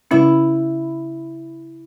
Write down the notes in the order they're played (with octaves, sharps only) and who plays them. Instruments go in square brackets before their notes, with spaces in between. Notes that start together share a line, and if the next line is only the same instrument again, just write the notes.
[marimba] C#3 G#3 C#4 [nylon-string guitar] E4